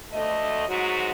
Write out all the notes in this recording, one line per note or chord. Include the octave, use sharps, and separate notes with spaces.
D2 A3 D#5
G#2 F#3 F#4